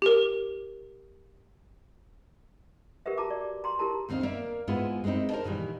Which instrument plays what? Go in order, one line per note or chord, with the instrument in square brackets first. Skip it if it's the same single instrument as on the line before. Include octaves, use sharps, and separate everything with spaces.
[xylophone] G4 A#4
[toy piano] G4 A#4 B4 E5
F#4 A5 A#5 D6
D5
A#5 C6
E4 G4 A#4 A5 A#5
[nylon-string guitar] D2 D#3 C4 D#4 F5
A#3 A#4 D5 E5
G#2 G#3 A#3 B3 E4 F4
G#3 A#3 C4 D#4 E4
A#4 C5 D5 A5
A#2 D#3 E3 G3